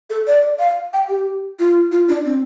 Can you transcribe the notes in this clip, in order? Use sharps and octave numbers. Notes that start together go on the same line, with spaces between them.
A4
D5
F5
G5
G4
F4
F4
D4
C4